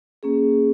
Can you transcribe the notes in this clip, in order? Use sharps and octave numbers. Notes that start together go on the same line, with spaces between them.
A#3 C#4 G#4